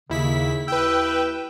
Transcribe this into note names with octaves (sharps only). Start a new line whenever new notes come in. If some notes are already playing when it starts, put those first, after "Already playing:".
D#2 C#3 E4 B6
D#2 E4 B4 G5 E6